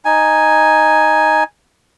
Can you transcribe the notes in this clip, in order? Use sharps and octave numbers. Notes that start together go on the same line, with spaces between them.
D#4 G#5